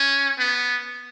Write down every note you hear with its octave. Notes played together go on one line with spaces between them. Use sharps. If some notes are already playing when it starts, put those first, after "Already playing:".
Already playing: C#4
B3